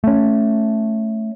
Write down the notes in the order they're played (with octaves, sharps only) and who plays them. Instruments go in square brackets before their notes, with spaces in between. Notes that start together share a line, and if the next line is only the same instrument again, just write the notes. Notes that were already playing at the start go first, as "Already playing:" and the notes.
[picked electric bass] A3 C#4